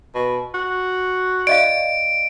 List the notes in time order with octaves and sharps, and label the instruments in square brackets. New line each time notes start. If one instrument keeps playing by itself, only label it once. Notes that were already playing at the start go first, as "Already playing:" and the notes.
[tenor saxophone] B2
F#4
[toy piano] D5 D#5 F5 [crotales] D7